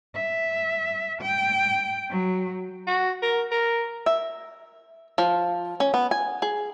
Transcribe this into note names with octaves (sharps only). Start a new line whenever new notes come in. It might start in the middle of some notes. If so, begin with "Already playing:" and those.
E5
G5
F#3
F#4
A#4
A#4
E5
F3
C#4
B3
G#5
G#4